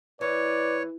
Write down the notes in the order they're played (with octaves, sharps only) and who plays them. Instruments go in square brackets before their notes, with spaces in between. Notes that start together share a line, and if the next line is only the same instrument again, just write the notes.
[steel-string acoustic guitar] E3 [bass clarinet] B4 [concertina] C#5 [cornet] D5